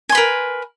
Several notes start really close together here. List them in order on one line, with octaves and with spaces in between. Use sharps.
G#5 C6 B4 A#4